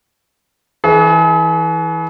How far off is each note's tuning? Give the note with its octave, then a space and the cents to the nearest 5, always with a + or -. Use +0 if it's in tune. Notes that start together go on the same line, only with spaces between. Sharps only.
E3 -20 G#4 +40